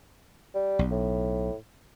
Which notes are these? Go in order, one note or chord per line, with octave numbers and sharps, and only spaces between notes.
G3
B1
A2